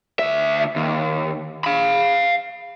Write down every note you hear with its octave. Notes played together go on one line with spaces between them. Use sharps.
D2 E5
D#2
F5 B5